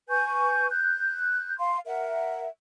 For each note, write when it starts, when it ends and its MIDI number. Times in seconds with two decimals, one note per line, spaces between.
0.09 0.67 71
0.09 0.67 80
0.09 0.67 85
0.09 0.67 91
0.71 1.56 90
0.71 1.56 91
1.59 1.78 77
1.59 1.78 84
1.86 2.46 70
1.86 2.46 76
1.86 2.46 78